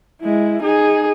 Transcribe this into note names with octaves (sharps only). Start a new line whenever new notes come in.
G#3 E4
D#4 G#4